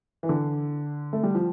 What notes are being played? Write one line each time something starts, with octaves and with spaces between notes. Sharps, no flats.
E3
D3
A3
G3
F3